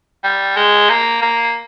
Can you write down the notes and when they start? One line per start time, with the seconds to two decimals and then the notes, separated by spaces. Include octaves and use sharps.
0.24 G3
0.57 G#3
0.90 A#3
1.22 A#3